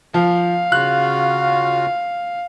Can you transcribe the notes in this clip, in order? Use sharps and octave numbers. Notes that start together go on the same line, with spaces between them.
F3 F5
C#3 F4 F#4 F#6